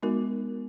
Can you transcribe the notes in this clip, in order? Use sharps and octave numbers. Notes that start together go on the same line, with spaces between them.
G#3 B3 D#4 F#4 A#4